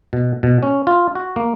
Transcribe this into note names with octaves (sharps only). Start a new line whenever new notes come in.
B2
B2
C#4
F4
F#4
A#3